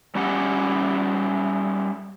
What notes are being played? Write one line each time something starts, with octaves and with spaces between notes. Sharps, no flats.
G3 C#4 E4 G4 F#5